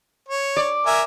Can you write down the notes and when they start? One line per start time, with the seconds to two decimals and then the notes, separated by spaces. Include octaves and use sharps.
0.28 C#5
0.56 D5
0.86 A#4 E5 G#5